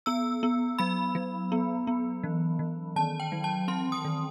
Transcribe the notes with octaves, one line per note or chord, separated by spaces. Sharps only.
B3 E6
B3
F#3 B5
F#3
B3
B3
E3
E3
D#3 A5
G5
F#3
A5
C4 C6
D#6
D#3